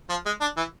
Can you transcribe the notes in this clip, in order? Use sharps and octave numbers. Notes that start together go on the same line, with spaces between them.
F3
G#3
D4
E3